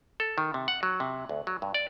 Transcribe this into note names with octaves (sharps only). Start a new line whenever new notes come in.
A4
D#3
C3
F#5
F#3
C3
D2
F#3
G2
D5